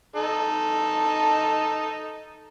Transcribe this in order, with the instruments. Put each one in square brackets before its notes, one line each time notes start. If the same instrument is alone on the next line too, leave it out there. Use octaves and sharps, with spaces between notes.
[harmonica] D#4 A4